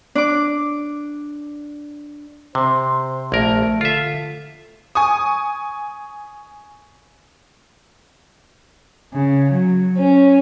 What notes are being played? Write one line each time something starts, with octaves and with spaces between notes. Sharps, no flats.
D4 D6
C3 C5
A#1 A3 A#4
D3 F4 E5
G#5 C#6 D#6
C#3
F#3
C#4